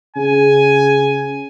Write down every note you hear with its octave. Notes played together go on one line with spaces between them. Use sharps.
C#3 G#5